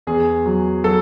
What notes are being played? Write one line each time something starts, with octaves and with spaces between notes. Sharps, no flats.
E2 G#4
F#3
F#3 A4